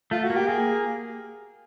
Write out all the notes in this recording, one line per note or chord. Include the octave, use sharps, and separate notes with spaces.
A3 F4
F#4
A#3
G4
A#3 G#4